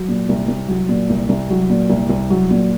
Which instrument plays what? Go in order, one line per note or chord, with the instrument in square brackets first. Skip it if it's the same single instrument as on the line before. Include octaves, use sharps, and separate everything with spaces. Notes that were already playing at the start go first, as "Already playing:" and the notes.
Already playing: [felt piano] F#3
A#2
C2
C2
F#3
A#2
C2
C2
F#3
A#2
C2
C2
F#3
A#2